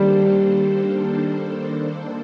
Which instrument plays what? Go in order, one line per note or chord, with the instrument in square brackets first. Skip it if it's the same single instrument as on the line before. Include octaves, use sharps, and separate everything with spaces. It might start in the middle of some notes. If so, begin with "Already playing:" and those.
Already playing: [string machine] D#3 A#3 D4 A4 C5 [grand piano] G3